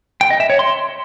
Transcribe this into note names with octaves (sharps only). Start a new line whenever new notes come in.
G5
D#5
E5
C#5
C6